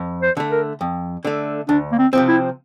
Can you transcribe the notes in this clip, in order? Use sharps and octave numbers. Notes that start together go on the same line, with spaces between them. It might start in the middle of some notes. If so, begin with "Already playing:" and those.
Already playing: F2
C5
D3 A3
A#4
F2
D3 A3
D2 D4
A#3
C4
C3 F3 C4
E4